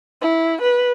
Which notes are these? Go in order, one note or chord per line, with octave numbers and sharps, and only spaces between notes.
E4
B4